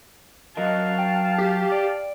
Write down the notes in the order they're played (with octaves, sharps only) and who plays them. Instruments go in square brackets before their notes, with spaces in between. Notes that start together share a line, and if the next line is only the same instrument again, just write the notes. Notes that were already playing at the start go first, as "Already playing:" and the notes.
[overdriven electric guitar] F#3 A#4 [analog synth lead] D#5 [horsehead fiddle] F5 A5
[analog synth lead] G5
[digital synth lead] G4
[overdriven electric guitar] D5